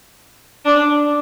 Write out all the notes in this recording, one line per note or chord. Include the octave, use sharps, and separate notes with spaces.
D4